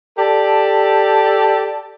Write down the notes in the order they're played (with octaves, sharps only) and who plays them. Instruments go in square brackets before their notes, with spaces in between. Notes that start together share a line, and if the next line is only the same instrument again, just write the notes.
[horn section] G4 A4 D5 A5